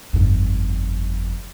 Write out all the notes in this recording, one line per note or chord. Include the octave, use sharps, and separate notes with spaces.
G1 F2